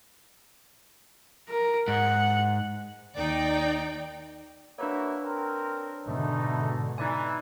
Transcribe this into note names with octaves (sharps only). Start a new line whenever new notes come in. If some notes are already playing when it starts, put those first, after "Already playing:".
A#4
G#2 F#5
D#2 D#4 D5 G5
A#3 D4 E4 F#4 B4 C#5
C4 A#4
E2 G#2 B2 D3 A3 D#4
E3 D#4 D5 G#5